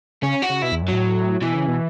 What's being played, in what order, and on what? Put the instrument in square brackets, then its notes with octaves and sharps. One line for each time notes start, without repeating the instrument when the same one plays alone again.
[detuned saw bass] C#3 [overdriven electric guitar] C#4
[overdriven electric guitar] F#4
[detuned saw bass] C#3
[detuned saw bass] B2 [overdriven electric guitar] E4
[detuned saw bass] E2
F#2
[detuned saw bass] A2 [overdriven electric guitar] F#3
[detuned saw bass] B2 [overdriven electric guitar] E3
[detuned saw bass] C#3
B2